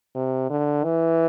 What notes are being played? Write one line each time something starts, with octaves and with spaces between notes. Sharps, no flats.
C3
D3
E3